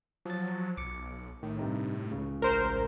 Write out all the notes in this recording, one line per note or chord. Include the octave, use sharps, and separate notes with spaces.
F3 F#3 A6
B1 D6 C#7
A2 D#3
G2 C3 D#4
C#2 C#3
A1 A#4 C5